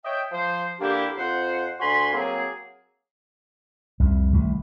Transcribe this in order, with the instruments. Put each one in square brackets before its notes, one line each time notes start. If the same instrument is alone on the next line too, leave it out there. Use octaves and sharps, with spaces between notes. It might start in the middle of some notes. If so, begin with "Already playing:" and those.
[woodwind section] C#5 D#5 E5 G5
F3 C5
D3 A#3 D4 E4 G4
F2 C5 F#5
D2 F#4 G#5 B5 C6
F#3 A#3 C4 G#4
[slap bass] C2 F2
C2 D#3 A3